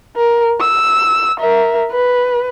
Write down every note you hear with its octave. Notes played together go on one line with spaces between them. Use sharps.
A#4
E6
A#4 E5
B4